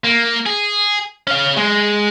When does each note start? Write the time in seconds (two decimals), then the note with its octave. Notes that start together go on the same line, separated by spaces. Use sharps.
0.05 A#3
0.46 G#4
1.28 C#4 F5
1.57 G#3